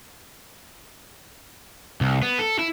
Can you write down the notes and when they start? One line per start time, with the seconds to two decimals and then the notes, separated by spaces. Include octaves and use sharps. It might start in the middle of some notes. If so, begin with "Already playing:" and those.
2.01 C2
2.22 B3
2.39 A4
2.59 E4